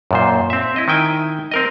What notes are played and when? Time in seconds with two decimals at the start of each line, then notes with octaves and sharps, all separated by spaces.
0.11 F#2 A#2 C5
0.50 C4 E5
0.76 E4 D#5
0.88 D#3 E4 G5 G#5
1.51 C4 A#4 D#5